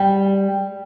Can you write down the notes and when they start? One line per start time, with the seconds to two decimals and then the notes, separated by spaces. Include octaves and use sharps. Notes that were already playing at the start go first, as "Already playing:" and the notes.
Already playing: G3